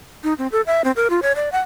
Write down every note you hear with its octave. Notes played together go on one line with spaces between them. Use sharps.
D#4
C4
A4
E5
C4
A#4
F4
C#5
D5
F#5